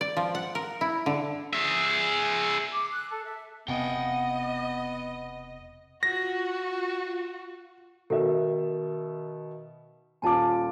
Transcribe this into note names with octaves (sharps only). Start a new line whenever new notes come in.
D5
F3
F#5
A#4
E4
D3
G#4 E5
D6
F#6
A4
E5
E1 C3 B3 D#5 F#5 G5
F4 F#4 A#6
B2 D#3 A4 E5
D#1 F4 G#5 A5 D6